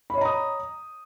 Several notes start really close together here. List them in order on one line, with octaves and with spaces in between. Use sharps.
B5 C#5 D#5 A#5 D#6